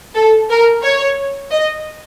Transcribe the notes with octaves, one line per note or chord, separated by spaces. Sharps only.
A4
A#4
C#5
D#5